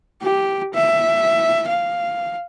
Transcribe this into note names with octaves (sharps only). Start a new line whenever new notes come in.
G4
E5
F5